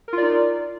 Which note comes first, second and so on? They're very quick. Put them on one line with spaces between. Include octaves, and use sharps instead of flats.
A#4 F4 D5 D#4